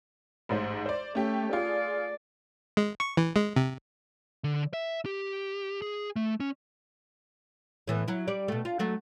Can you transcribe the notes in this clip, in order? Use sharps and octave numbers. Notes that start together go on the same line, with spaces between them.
A1 G#2 C5
C5 D5
A3 C#4 G4
F4 G#4 D5
G#3
C#6
E3
G#3
C3
D3
E5
G4
G#4
A3
C#4
A2 E3 B3
F#3 E4
G3 D5
B2 A3
F4
F#3 A3 F#4